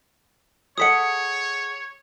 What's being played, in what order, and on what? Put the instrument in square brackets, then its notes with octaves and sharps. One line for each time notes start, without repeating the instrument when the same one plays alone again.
[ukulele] G#4 A4 F#5 [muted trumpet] C#5 [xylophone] D#6 B6 C#7